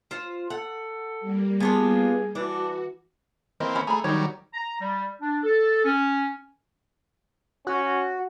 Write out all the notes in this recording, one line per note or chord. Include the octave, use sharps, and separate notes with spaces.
F4 C5
A4 F#5
G3 A#3
B3 D4 F4 G#4
E3 D4 F#4
E3 A#3 C4 D#5
C#4 B5
A3 G#4 A#5 B5
D#3 F#3 G3 D#4 C#5
A#5
G3
D4
A4
C#4
C#4 F#4